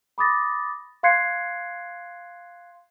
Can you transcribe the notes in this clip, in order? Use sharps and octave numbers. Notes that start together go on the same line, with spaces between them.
B5 D6 D#6 A6 A#6
F5 C6 F#6 G#6 C7 C#7